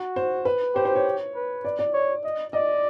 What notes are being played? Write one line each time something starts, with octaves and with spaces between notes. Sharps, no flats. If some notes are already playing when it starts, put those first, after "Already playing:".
Already playing: F#4
C5
B4
G4 C5
C5
C#5
B4
D5
D5
C#5
D#5
D5 D#5